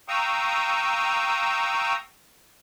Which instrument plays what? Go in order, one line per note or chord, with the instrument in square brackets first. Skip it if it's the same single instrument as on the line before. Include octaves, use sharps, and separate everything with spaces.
[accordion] F5 G5 A#5 C#6 D#6 E6